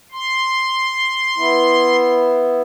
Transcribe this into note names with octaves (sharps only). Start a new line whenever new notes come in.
C6
B3 E4